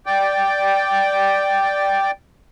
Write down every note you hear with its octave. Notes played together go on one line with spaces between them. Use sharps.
D5 G5